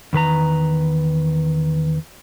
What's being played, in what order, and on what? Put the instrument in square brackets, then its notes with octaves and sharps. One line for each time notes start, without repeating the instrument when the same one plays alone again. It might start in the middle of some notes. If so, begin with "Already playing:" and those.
[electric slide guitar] E2 D#3 B4 A#5